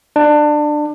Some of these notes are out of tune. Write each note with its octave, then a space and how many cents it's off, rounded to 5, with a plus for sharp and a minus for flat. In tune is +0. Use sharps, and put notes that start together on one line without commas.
D4 +20